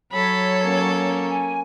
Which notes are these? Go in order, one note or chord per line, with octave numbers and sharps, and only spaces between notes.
F#3 A4 C#5 B5
A#3 C#4
G#5